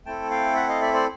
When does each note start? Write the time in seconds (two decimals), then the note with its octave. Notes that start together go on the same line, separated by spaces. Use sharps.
0.06 A3 C4 E4 A4 G5 A5
0.30 F5 G5
0.55 E5 F#5
0.69 D#5 F5
0.82 D5 E5
0.94 C5 D5